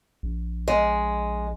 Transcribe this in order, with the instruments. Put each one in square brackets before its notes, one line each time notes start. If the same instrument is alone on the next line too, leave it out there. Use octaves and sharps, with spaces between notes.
[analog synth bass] A#1
[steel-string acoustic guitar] G#3